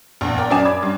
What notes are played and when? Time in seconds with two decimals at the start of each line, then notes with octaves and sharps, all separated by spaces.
0.21 A#1 E2
0.38 A#4 D5 G5
0.50 F#2 C#4 D5 G#5 D#6 E7
0.65 B5 D6 G#6
0.83 G2